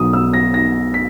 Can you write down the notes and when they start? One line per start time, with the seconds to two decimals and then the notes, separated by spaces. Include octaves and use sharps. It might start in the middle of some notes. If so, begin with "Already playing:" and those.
Already playing: B1 B2 F#3 D#6
0.13 E6
0.33 A#6
0.54 A#6
0.94 B6